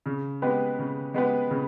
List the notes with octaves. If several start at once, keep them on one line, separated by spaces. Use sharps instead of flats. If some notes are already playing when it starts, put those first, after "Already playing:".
C#3
G#3 B3 G4 B4
C#3
G#3 B3 G4 B4
C#3